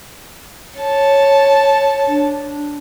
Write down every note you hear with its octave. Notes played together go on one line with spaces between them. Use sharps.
C#5 A5
D4